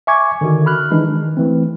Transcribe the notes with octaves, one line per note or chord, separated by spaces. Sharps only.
E5 G#5 C#6 D6 G#6
D3 D#3 F#4
B5 F6 F#6
D#3 E3 G#3 D4 D#4
D#3
E3 A3 C4